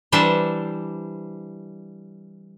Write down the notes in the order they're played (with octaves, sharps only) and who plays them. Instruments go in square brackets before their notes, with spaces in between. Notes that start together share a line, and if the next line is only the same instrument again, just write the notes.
[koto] E3 G3 D4 C5 E5